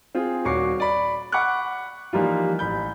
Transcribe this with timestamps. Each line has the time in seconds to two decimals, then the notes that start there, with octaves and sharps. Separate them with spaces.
0.15 C4 F4 G#4
0.45 D#1 F#4 C#5 C#6 D6 C7
0.80 D5 B5
1.32 F#5 B5 C#6 D6 F#6
2.13 E3 F3 G3 A#3 D#4 F4
2.59 A1 B5 G6